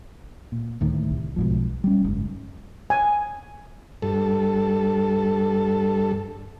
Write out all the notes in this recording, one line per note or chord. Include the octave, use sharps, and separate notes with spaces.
A#2
D2 A2 D#3
C2
B1 G#2 F3
G3 C#4
F#1 G#2
G#5
G2 A4